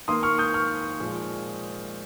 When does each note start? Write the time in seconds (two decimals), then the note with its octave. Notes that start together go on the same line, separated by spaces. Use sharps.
0.08 D#3 A#3 C6 D#6
0.23 C#6 F6
0.38 D#6 G6
0.54 C#6 F6
1.00 A#2 F3 G#3